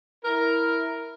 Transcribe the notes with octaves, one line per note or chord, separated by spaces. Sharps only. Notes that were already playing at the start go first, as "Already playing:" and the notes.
E4 A#4